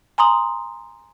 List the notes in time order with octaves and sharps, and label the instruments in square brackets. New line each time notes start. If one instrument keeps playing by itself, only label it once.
[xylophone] G#5 A#5 C6 D#6 F#7